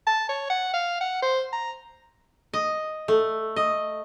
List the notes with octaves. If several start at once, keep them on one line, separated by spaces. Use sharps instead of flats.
A5
C#5
F#5
F5
F#5
C5
A#5
D#5
A3
D#5